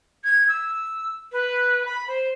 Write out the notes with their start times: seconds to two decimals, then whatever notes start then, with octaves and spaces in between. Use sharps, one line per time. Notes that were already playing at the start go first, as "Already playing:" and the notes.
0.24 G#6
0.48 E6
1.32 B4
1.85 B5
2.07 C5